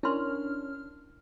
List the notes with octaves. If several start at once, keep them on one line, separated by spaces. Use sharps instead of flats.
C#4 D4 E4 A#4 C6 F6